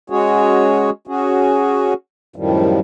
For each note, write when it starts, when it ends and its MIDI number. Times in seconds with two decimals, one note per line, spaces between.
0.10 0.90 56
0.10 0.90 61
0.10 0.90 66
0.10 0.90 68
0.10 0.90 73
1.07 1.94 61
1.07 1.94 66
1.07 1.94 68
2.36 2.80 42
2.36 2.80 45
2.36 2.80 51
2.36 2.80 53
2.36 2.80 55